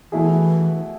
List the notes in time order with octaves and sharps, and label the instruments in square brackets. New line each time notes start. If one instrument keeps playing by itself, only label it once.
[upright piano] B2 A3 E4 G#4 [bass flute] E3